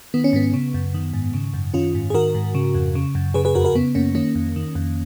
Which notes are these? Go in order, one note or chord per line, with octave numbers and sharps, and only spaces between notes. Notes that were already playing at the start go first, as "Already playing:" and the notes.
D#3 B3
C#4
G#2 B3
C#3
F#2
D#3
G#2
C#3
F#2
D#3 C#4 F4
G#2
G#4
D#3 F#4 A#4
G#2
C#3
F2
C#3
F#2
C#3 G#4 B4
G#4 B4
F2 F#4 A#4
F#4 A#4
C#3 B3
F#2 A#3 C#4
D#3 A#3 C#4
F2
D#3
F2